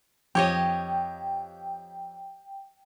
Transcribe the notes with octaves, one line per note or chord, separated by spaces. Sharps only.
F2 G4 C#5 D#5 G5